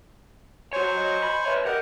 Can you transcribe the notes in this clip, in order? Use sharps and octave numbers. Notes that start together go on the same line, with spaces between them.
F#4 C5 C#5 G#5 C#6
D#5
B5
B4 C#5 E5
G4 A#4 D#5 F#5